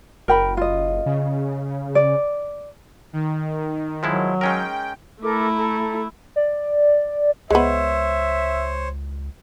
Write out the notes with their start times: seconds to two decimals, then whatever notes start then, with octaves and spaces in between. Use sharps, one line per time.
0.28 F#1 A#4 G5 B5
0.57 F4 D#5
1.06 C#3
1.95 D5
3.13 D#3
4.03 F3 F#3 G#3 E4
4.41 G#3 C#4 A#4 G5
5.22 A3 E4 A4 A#4 D6
5.56 A4 A#5
6.36 D5
7.50 C#2 G#3 B3 C5 C#5 E5